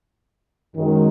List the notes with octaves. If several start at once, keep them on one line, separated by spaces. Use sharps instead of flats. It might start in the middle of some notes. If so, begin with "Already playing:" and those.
F#2 D#3 G#3